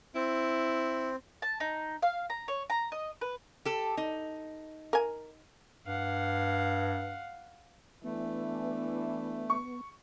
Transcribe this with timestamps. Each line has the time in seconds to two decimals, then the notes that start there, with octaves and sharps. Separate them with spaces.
0.15 C4 E4
1.42 A5
1.60 D#4
2.02 F5
2.30 A#5
2.48 C#5
2.70 A#5
2.92 D#5
3.21 B4
3.65 G4 A4
3.97 D#4
4.93 A#4 G#5
5.87 G2 F5 F#5
8.04 E3 A3 B3 D4
9.50 C#6